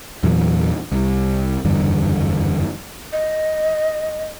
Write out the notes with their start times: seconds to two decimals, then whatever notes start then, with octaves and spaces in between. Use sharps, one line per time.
0.23 E2 A#2 E3 F#3
0.92 C2
1.65 F#1 E2 G2 D3
3.13 D#5